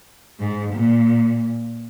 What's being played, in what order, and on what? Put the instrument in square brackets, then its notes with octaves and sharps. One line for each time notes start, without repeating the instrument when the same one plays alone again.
[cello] G#2
A#2